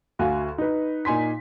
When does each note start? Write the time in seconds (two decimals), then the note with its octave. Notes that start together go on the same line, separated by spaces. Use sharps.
0.19 D2 F#4 F5 G#5
0.58 D#4 B4
1.05 A#2 D#4 G#5 C6 B6